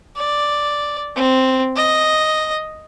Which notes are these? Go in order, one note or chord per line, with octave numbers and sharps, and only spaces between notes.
D5
C4
D#5